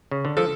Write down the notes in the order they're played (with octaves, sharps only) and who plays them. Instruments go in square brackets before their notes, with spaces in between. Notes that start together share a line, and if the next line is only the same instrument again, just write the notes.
[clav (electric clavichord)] C#3
D3
[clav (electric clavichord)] F3 [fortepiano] A4